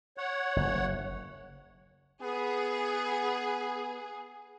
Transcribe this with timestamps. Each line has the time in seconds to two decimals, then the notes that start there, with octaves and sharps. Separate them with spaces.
0.17 C#5 F#5
0.56 F#1
2.23 B3 G#4